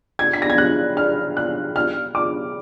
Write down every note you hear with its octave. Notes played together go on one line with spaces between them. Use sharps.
G#6
B6
A#6
G#6
F#6
F6
F#6
F6
D6